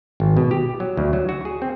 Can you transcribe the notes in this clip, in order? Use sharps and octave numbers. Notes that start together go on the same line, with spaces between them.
G#1
B2
G4
F#3
D2
F#3
F#4
G#4
C4